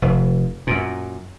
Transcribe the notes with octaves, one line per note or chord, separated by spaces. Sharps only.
F1
F#2 A#2